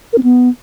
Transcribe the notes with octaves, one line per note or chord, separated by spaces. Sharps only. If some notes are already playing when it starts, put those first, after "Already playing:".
A#4
C4
B3